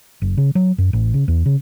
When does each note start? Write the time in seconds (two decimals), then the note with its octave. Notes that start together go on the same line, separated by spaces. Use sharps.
0.22 F#1
0.37 C#3
0.55 F#3
0.78 F#2
0.93 A1
1.14 C#3
1.28 E2
1.46 C#3